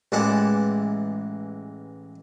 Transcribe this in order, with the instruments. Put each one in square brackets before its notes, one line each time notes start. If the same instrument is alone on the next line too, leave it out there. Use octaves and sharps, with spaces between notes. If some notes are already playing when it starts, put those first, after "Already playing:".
[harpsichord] A1 E3 G#3 F#5 A5 D6